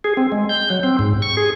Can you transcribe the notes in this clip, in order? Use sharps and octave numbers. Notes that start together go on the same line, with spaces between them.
G#4
C4
G#3
G6
F#3
C4
G#2
C#6
G#4